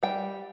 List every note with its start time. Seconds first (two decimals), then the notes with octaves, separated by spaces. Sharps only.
0.03 G3 G5